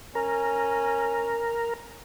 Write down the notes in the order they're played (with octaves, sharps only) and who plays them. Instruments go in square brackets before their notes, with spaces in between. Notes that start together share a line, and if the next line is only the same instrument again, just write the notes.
[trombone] C#4 [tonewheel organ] A#4